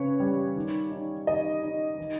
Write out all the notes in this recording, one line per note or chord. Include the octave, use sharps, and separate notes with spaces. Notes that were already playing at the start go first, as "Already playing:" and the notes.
Already playing: C#3 B4 C#5
G3
D#3
D#4
D#3 D#5
D#4
D#3